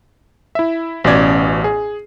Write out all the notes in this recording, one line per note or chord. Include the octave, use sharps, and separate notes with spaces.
E4 E5
A1 B2 C#4 D5 G#6
G#4